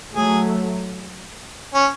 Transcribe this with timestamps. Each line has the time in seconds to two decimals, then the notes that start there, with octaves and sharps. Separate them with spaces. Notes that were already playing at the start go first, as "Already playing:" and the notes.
0.14 F#3 A3 G#4
1.74 C#4